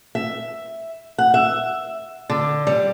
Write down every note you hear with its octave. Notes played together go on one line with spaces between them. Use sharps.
E5
F#5
E5
D3
G3